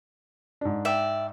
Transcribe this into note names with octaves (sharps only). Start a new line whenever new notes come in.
G#2 D4
D5 E5 G5